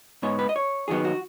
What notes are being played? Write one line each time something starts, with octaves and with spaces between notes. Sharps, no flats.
G#2 G#3 B3 C#5
B4
D#5
C#5
D#2 D#3 F#3 B3 G#4
F#4